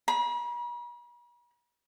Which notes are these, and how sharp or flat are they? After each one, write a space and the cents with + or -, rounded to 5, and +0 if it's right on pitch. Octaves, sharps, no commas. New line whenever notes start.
B5 -45